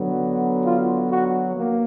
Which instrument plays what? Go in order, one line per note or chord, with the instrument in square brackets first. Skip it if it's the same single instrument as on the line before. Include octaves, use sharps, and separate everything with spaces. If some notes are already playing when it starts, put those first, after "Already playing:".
Already playing: [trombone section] D3 F#3 B3
F4
F#4
A#3